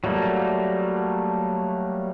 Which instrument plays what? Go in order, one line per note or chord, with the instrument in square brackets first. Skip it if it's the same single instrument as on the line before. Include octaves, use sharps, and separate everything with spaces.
[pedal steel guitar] F#3 G3 A3 A#3